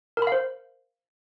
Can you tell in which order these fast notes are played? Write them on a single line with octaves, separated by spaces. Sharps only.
A#4 B5 F5 C5